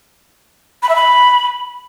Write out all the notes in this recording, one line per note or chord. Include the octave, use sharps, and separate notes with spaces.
B5
E5
B5